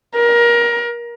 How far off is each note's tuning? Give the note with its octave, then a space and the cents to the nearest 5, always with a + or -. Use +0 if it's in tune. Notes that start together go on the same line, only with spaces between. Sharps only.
A#4 +25